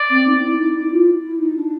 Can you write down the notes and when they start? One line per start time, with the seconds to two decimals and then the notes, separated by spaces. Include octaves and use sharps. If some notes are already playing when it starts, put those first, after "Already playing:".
Already playing: D5
0.10 C4
0.27 D#4
0.38 D#4
0.42 E4
0.59 D#4
0.75 E4
0.92 F4
1.23 E4
1.40 D#4
1.56 D4